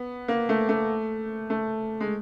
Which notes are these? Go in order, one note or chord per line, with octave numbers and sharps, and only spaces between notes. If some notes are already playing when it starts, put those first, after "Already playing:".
Already playing: B3
A#3
A3
A3
A3
G#3